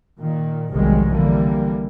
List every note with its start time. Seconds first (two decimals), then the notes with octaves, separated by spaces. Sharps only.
0.18 A#2 D#3
0.70 F1 B1 G#2 D#3 G3 G#3
1.11 D3 E3 G3 A#3